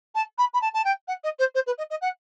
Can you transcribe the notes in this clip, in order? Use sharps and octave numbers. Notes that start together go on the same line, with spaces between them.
A5
B5
B5
A5
A5
G5
F#5
D#5
C5
C5
B4
D#5
D#5
F#5